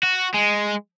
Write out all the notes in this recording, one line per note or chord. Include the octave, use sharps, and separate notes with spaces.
F#4
G#3